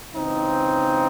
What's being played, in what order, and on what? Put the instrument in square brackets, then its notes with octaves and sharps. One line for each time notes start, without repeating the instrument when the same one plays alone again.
[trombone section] C#2 C#3 E3 C4 D#4